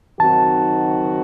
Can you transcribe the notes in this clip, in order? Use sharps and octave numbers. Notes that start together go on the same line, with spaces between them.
D#3 F#3 C4 D#4 F#4 A5